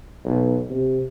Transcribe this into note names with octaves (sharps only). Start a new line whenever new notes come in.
B1
C3